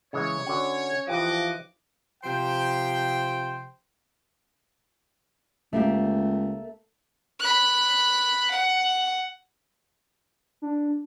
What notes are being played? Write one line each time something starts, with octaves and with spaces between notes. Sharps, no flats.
C#3 E3 G#3 C#5
D3 C#4 F#4 F#5
E3 F3 G4 D#5 F5 F#5 D6
C3 F3 C5 G5
C#2 A3 A#3 G4
B5 F#6
F#5
D4